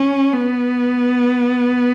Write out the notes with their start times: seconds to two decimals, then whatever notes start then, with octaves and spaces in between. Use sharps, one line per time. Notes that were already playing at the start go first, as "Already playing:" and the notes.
Already playing: C#4
0.33 B3